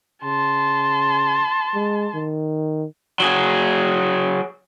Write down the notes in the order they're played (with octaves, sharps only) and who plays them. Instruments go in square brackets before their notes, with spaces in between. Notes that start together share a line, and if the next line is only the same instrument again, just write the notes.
[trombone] C#3 [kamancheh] A5 C6
[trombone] G#3
D#3
[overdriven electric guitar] F#3 G#4